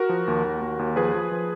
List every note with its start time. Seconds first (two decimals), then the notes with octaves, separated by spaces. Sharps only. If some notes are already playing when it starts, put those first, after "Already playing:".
Already playing: F#4 A#4
0.09 F3
0.28 D#2
0.45 D#2
0.62 D#2
0.79 D#2
0.96 F3 G#4 B4
1.14 F3
1.31 F3